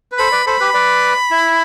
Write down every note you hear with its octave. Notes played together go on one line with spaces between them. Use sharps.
B4
A4 C5 B5
B4 D5
A4 C5 B5
G4 B4
B4 D5
E4